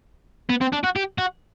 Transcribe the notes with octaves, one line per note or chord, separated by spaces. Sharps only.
B3
C4
D4
F#4
G4
F#4